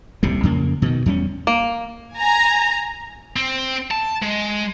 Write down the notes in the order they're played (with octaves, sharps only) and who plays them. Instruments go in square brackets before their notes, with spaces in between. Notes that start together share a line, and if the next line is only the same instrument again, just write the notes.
[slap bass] D#1 C2 C3 G3
F2 C#3 A#3
B2 D3 D#3
E2 G3 C4 C#4
[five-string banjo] A#3
[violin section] G#5 A#5
[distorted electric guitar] C4
A5
G#3